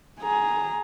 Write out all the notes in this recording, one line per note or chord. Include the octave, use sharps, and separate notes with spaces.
G#4 A#5